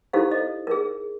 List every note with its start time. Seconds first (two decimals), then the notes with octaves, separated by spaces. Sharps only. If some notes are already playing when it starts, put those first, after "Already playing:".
0.13 D#4 E4 G4 A4 C5 F5
0.31 A4 D#5
0.67 G#4 A#4